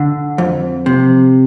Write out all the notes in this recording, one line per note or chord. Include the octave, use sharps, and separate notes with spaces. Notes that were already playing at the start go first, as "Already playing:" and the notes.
Already playing: D3
F2
C3